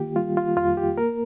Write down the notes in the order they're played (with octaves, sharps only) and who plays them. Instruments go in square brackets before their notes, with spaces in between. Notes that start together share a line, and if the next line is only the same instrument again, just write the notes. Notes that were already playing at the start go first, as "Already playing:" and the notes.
Already playing: [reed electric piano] D#3 A#3 F4 G4
G3 F4
F4
F2 F4
G4
A#3 A#4